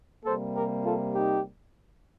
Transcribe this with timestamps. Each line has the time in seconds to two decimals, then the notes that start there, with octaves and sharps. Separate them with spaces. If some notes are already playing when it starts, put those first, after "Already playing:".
0.25 C3 G3 A#3 A4 C5
0.54 G4 A#4
0.84 F4 A4
1.13 D#4 G4